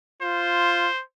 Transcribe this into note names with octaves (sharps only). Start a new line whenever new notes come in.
F4 C5